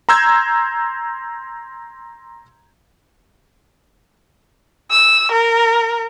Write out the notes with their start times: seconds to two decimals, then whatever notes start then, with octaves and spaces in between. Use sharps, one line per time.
0.09 A#5 C6 E6 G6 G#6
4.91 E6
5.32 A#4